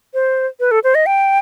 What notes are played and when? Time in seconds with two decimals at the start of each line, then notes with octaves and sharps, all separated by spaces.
0.14 C5
0.60 B4
0.71 A4
0.84 C5
0.95 D#5
1.06 G5